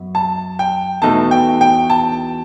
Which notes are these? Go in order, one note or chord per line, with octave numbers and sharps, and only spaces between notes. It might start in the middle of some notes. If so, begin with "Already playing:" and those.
Already playing: F#2 B3
A5
G5
E2 B2 A3 D#4 A5
G5
G5
A5